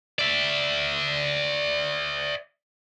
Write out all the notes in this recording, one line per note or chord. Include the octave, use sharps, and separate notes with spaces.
D5 E5